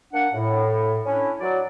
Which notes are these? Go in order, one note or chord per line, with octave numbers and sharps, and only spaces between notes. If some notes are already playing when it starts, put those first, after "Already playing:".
A#3 D4 F#5
A2
C#4 D4 E4
F#3 D5